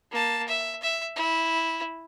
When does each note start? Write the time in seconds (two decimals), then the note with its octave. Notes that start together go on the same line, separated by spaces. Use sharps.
0.12 A#3 A5
0.48 E5
0.82 E5
1.16 E4